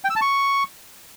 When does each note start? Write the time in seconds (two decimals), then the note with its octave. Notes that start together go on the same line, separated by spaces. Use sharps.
0.04 G5
0.10 E6
0.16 A5
0.21 C#6